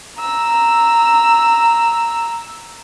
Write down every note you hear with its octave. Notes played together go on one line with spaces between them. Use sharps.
A#5 E6